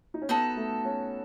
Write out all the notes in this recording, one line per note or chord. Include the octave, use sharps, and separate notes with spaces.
D#4
C#4
B3 D#4 F#4 A4
A3
C#4